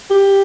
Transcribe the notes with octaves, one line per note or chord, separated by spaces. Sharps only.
G4